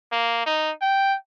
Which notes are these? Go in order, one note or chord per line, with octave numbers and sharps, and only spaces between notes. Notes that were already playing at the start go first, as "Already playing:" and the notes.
A#3
D#4
G5